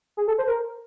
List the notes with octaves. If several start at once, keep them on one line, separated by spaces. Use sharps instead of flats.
G#4
A4
C5
A#4